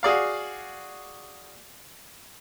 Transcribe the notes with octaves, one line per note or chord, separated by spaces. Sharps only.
F#4 G#4 D5 F5